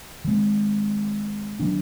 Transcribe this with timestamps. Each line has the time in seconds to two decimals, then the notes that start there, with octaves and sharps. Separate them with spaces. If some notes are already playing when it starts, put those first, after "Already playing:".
0.24 D#3 G#3 C4
1.60 D#3 F#3 B3 D4